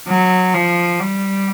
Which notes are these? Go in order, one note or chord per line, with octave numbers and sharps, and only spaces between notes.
F#3
F3
G3